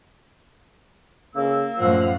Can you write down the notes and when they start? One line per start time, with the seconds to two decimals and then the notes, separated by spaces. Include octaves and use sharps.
1.36 C#3 A#3 E6
1.79 F#2 A2 F3 F5 F#5